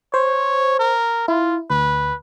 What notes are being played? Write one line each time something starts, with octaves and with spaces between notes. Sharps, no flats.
C5 C#5
A#4
E4 F4
D2 B4